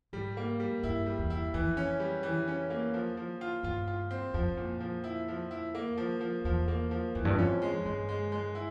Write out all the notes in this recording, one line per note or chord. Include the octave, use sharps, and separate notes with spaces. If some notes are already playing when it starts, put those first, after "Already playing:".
G#2 G3
A#3
G3
G2 E4
G3
E2
E4
F2 E3
C#4
G3
E3
C#4
A#3
F3
F3
F4
G2 F4
F4
C4
F2 F3
A#2
F3
E4
F3
E4
A#3
F3
F3
E2 F3
A#3
F3
F2 E3
G2
F2 C#4
G#3
G2 G#3
G#3
G#3
E4